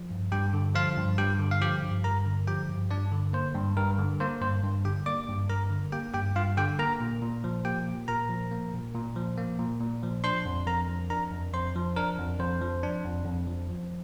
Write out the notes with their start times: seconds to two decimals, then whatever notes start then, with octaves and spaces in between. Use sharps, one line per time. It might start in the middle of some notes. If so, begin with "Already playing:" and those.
Already playing: F3
0.10 G2
0.31 G2 G4 G5
0.54 D3
0.75 F3 F4 F5
0.97 G2
1.18 G2 G4 G5
1.40 D3
1.51 F5
1.61 F3 G4 G5
1.83 G2
2.04 G2 A#4 A#5
2.26 D3
2.47 F3 G4 G5
2.69 G2
2.90 G2 D4 D5
3.12 D3
3.33 A#3 C5
3.55 G2
3.77 G2 A#4
3.98 D3
4.20 A#3 C5
4.42 G2 C5
4.63 G2
4.85 D3 G4 G5
5.06 A#3 D5 D6
5.29 G2
5.49 G2 A#4 A#5
5.71 D3
5.92 A#3 G4 G5
6.14 G2 G4 G5
6.36 G2 F4 F5
6.57 D3 G4 G5
6.79 A#3 A#4 A#5
7.00 A#2
7.22 A#2
7.44 F3
7.65 A#3 G4 G5
7.86 A#2
8.08 A#2 A#4 A#5
8.29 F3
8.52 A#3
8.73 A#2
8.95 A#2
9.16 F3
9.38 A#3
9.59 A#2
9.81 A#2
10.03 F3
10.24 D4 C5 C6
10.45 F2
10.67 F2 A#4 A#5
10.89 F3
11.10 D4 A#4 A#5
11.31 F2
11.54 F2 C5 C6
11.76 F3
11.96 D4 A#4
12.18 F2
12.40 F2 C5
12.61 F3
12.83 D4
13.04 F2
13.26 F2
13.47 F3
13.69 F3